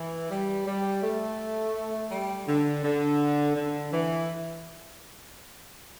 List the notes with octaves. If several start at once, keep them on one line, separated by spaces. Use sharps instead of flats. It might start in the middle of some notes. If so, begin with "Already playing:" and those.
Already playing: E3
G3
G3
A3
G3
D3
D3
D3
E3